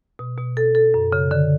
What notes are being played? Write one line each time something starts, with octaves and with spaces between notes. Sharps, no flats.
B2
B2
A4
A4
F#2
C#3
D3